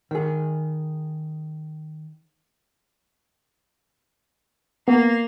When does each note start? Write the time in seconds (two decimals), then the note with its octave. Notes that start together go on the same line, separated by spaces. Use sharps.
0.11 D#3 G#4
4.88 A#3 B3